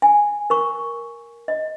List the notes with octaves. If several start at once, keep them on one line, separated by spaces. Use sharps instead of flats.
G#5
A#4 C#6
D#5